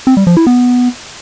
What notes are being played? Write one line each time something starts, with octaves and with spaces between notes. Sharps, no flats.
C4
G3
F3
E4
B3